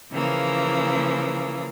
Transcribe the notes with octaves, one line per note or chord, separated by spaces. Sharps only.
C#3 E3 F3 A#3